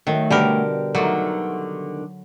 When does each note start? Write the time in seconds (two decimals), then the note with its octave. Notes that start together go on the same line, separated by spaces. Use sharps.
0.07 D#3 F#3 A3
0.30 B2 D3 G3 G4 A#4
0.95 D3 D#3 F#3 A3